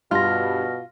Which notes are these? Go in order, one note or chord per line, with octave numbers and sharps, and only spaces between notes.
G2 B2 F4 F6 A#6